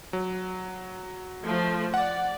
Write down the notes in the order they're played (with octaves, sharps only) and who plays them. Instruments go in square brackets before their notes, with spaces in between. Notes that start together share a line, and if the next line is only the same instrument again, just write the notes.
[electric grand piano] F#3
[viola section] F3 A3
[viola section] D5 [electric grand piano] F#5